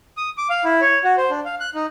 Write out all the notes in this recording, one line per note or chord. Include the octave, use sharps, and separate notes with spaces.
D#6
D6
F5
E4
C#5
F#4
C5
D4
F5
F#6
D#4